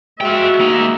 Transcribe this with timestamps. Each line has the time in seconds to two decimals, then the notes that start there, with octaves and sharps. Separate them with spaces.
0.21 G#3 F4 F#4 E5 G5
0.60 A#3 D#4